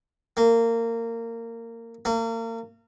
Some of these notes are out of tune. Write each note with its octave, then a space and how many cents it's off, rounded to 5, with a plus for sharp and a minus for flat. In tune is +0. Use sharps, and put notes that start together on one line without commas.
A#3 -20
A#3 -35